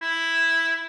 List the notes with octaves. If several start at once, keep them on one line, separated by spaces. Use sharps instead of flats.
E4